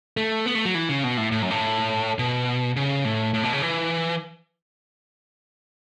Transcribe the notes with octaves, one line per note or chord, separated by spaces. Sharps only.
A3
B3
A3
F#3
E3
C#3
B2
A2
A2
F#2
A2
B2
C#3
A2
A2
B2
C#3
E3